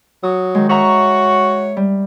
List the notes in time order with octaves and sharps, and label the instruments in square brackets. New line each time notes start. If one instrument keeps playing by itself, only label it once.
[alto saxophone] F#3 [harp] C#6 D#6
[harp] D#3 G#3
[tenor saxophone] F#4 [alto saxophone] C#5 [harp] E5 A#5 C#6
[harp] G3